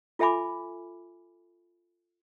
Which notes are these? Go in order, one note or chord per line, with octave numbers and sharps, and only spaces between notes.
F4 A4 E5 G#5 B5 D6